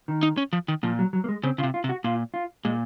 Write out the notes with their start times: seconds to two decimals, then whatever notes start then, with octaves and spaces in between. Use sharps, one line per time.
0.08 D#3
0.23 D#4
0.37 C#4
0.53 F3
0.68 D#3
0.83 A#2 F3
0.99 F#3
1.13 F#3
1.24 A#3
1.29 G#3
1.43 C#3 C4
1.58 C#3 F4
1.63 C3
1.74 F4
1.84 C3
1.89 F#4
2.04 A#2 F4
2.34 F4
2.65 A#2 G#3